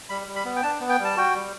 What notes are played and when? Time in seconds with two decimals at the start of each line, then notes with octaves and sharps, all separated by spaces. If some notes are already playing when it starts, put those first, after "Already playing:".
0.09 G3 B5
0.28 G3
0.36 B5
0.45 B3
0.56 G5
0.63 D4 A5
0.80 B3
0.89 G5
0.99 G3 A5
1.17 F#4 G5
1.35 G3